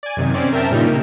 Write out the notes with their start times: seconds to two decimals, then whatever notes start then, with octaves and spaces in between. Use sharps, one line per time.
0.03 D5 G#5
0.17 F#2 C3 D#3
0.34 C4 C#4 D5
0.53 A#4 E5 G5 A5
0.70 G2 A#2 C#3 G3 D#4
0.87 A#3